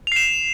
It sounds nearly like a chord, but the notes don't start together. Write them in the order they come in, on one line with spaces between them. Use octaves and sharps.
F7 C7 E7